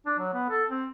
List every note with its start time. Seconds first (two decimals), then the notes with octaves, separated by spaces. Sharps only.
0.06 D4
0.19 F#3
0.33 B3
0.49 A4
0.69 C4